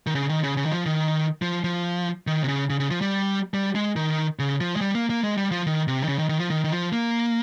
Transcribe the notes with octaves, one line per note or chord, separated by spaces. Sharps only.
D#3
C#3
D#3
C#3
C#3
D#3
F3
D#3
F3
F3
D#3
C3
C#3
C#3
C#3
F3
G3
G3
G#3
D#3
C#3
F3
G#3
G3
A#3
A#3
G#3
G3
F3
D#3
C3
D#3
C#3
D#3
D#3
F3
D#3
D#3
F3
A#3